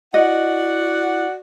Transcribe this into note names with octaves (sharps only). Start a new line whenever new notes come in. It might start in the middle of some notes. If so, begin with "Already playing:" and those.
E4 F#4 D5 D#5 F#5